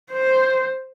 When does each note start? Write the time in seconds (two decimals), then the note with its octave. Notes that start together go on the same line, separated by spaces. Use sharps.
0.12 C5